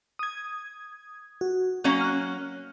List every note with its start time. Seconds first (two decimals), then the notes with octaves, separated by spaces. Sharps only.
0.19 D#6 G#6
1.41 F#4
1.84 F#3 A#3 C#4
2.01 F6 F#6